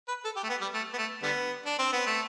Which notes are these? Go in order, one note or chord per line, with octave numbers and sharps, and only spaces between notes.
B4
A4
G4
A3
B3
G3
A3
B3
A3
D3 G3 B3
D4
C4
B3
A3